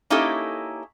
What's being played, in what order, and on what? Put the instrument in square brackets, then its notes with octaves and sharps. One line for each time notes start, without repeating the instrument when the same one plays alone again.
[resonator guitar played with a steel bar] A#3 C#4 D#4 E4 G4 A4